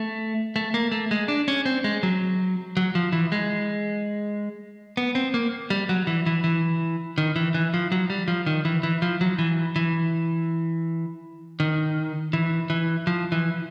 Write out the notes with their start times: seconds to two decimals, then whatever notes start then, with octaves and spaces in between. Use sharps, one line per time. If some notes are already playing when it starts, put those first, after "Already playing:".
Already playing: A3
0.56 A3
0.74 A#3
0.92 A3
1.11 G#3
1.28 D4
1.48 C#4
1.66 C4
1.84 G#3
2.03 F#3
2.77 F#3
2.95 F3
3.12 E3
3.32 G#3
4.97 B3
5.15 C4
5.34 A#3
5.70 G3
5.89 F#3
6.07 E3
6.26 E3
6.44 E3
7.18 D#3
7.36 E3
7.54 E3
7.74 F3
7.92 F#3
8.10 G3
8.28 F3
8.46 D#3
8.65 E3
8.83 E3
9.02 F3
9.21 F#3
9.39 E3
9.76 E3
11.60 D#3
12.33 E3
12.70 E3
13.07 F3
13.32 E3